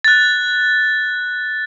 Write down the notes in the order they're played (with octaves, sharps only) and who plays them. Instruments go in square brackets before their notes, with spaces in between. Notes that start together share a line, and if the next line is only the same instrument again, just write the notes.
[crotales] F#6 A6